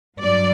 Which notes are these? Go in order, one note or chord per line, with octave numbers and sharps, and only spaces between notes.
G2 F#3 D5